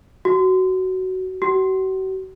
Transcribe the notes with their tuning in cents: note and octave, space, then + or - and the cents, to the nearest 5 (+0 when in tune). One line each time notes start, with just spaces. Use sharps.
F#4 +15
F#4 +40